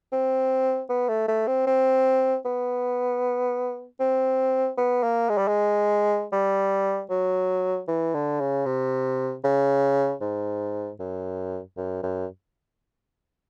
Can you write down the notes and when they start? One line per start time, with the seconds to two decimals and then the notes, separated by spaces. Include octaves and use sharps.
0.12 C4
0.90 B3
1.09 A3
1.28 A3
1.47 C4
1.67 C4
2.45 B3
4.00 C4
4.78 B3
5.03 A#3
5.29 G#3
5.38 G3
5.48 G#3
6.32 G3
7.10 F#3
7.88 E3
8.14 D3
8.40 C#3
8.66 C3
9.44 C#3
10.21 G#2
10.99 F#2
11.77 F#2
12.03 F#2